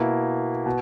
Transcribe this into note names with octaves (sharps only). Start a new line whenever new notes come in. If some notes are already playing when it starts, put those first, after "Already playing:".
Already playing: B2 A#3 E4
B2